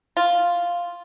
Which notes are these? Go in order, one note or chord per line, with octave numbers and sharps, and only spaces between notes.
F4